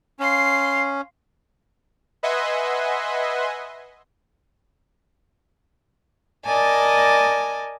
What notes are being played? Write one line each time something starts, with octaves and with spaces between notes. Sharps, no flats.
C#4 F5 C6
B4 D#5 E5 F#5 G#5 C6
A#4 D5 D#5 G#5 A5